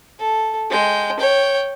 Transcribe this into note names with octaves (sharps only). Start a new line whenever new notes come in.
A4
G#3 G5
C#5 G5